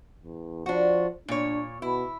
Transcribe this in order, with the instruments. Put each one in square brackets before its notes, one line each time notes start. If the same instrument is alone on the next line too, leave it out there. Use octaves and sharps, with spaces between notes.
[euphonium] E2
[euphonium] F3 [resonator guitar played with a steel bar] D4 F#4
[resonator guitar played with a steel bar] A#2 C#5 [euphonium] D4
[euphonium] B2 [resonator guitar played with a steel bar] E4